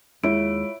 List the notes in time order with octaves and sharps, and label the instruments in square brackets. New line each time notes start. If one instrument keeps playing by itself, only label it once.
[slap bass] D#2 [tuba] G#3 [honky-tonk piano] E4 [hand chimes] F4 C#5 D7